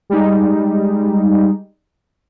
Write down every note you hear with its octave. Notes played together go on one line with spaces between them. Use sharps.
G3 G#3 D#4